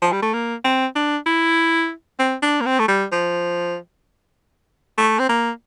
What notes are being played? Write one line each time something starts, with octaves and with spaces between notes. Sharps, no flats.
F3
G3
A3
A#3
C4
D4
E4
C4
D4
A#3
C4
A3
G3
F3
A3
C4
A#3